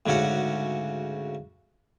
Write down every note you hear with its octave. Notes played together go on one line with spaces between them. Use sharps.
D2 G#2 C#3 C#4 F#4 F#5